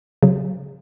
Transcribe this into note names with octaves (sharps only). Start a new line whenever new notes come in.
C#3 F#3